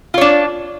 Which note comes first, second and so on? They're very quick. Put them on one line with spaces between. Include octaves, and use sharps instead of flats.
F4 C#5 D4